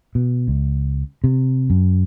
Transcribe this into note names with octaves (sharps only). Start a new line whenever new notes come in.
B2
C#2
C3
F#2